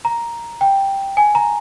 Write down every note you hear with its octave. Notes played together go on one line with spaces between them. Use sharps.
A#5
G5
G#5
A#5